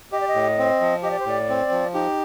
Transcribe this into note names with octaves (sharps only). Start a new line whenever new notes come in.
G4 D#5
D5
D#5
A2
C4
F3
G4 D#5
D5
C5
A2 D5
C4
F3
D#4 G4